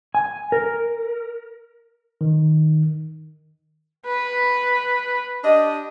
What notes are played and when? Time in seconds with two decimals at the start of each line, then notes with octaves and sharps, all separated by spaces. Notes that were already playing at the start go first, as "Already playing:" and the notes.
0.15 G#5
0.52 A#4
2.21 D#3
4.07 B4
5.44 D4 G4 D#5